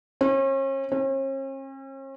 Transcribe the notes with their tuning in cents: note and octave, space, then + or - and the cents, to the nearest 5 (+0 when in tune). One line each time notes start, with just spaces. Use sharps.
C#4 -40
C#4 -45